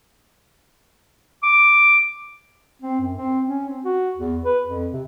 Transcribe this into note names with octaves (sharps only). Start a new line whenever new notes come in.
D6
C4
F#2
C4
C#4
C4
F#4
E2
B4
F2
C3